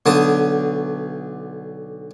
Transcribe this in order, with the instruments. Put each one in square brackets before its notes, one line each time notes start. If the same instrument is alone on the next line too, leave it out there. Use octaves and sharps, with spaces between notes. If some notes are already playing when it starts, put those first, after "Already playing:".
[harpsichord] B1 D3 A5 D#6